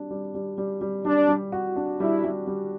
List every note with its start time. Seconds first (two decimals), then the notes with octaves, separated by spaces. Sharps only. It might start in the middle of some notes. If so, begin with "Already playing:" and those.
Already playing: G3 D4
0.11 G3
0.35 G3
0.58 G3
0.81 G3
1.05 G3 D4
1.29 G3
1.52 F#4
1.76 D4
2.00 G3 E4
2.24 G3
2.47 G3